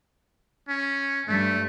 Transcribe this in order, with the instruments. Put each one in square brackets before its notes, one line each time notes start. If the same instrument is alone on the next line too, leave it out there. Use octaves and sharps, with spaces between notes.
[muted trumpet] C#4
[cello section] G2 [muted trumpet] A3